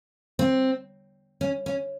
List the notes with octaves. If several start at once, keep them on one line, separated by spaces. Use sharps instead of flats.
C4
C#4
C#4